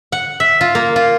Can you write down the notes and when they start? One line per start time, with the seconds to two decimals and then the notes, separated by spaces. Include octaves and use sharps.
0.12 F#5
0.40 E5
0.61 F4
0.75 A#3
0.96 F4